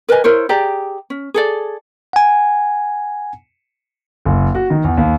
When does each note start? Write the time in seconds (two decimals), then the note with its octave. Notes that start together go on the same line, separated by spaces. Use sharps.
0.09 A#4 B4 D#5 G#5
0.24 E4 A#4 C5 C#5
0.49 G4 G#4 D5 A#5
1.10 C#4
1.34 G#4 A4 D5
2.13 F#5 G#5
4.25 F#1
4.55 F#4
4.70 D#3
4.84 E2
4.97 D#2